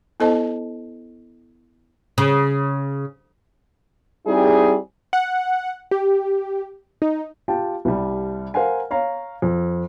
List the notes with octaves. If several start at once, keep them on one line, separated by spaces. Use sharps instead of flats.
B3 E4 A4 C5 D#5 A5
C#3
G3 C4 D#4 E4 G#4
F#5
G4
D#4
F4 G4 G5 A5
C2 G3
A#4 C5 F5 F#5 G#5
C#5 F5 A#5
F2